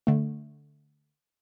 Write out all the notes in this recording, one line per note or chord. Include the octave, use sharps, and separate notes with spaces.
D3 A3